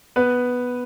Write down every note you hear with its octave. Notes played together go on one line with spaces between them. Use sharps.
B3 B4